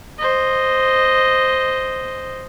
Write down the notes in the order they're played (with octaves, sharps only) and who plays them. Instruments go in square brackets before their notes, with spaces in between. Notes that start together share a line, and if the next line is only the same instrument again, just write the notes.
[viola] C5 D#5